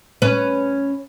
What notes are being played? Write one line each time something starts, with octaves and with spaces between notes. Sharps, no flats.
C#4 B4